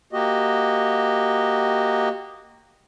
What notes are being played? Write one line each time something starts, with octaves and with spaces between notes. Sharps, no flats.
A#3 F#4 G4 D#5